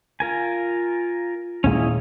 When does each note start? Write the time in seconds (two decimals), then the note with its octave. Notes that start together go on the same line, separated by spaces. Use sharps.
0.20 F4 A#4 G#5
1.64 D#2 A#2 G#3 C#4 E4 D#5